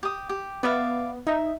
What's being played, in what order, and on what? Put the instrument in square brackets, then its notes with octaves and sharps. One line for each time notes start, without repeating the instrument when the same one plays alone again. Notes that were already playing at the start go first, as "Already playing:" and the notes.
[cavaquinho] G4 D#6
G4
[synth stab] B3 [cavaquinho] D5 E5 F5
[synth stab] D#4 [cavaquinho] E5